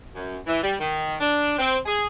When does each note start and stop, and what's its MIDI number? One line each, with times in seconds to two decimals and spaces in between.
0.15 0.37 42
0.46 0.62 52
0.62 0.74 55
0.80 1.14 51
1.20 1.57 62
1.58 1.77 60
1.86 2.05 68